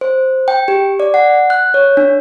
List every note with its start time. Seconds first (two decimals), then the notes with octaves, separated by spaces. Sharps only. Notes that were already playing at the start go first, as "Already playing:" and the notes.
0.01 C5
0.48 G5
0.68 G4
1.00 D5
1.14 F#5
1.50 F#6
1.74 C#5
1.97 D4